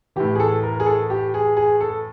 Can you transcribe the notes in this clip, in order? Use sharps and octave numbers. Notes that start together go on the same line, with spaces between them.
A2 E3 G4
G#4
A4
A#4
G#4
A4
G4
G#4
G#4
A4